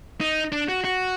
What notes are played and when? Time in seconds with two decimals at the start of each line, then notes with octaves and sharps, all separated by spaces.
0.20 D#4
0.52 D4
0.69 F#4
0.84 F#4